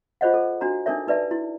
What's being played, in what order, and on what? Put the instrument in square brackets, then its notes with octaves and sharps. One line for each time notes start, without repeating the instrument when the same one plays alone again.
[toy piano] F4 G#4 C5 C#5 D#5 F#5
A4
D4 F#4 C#5 A#5
D4 D#4 A4 A#4 C#5 E5
D#4 B4 D5 E5 A5
E4